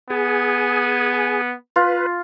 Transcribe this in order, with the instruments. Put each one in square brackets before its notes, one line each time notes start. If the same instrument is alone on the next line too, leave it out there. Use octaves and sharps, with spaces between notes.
[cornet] B3 [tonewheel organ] G#4 G#5
[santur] F4 [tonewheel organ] B4